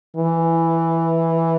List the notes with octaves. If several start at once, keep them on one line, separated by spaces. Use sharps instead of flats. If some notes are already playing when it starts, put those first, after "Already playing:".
E3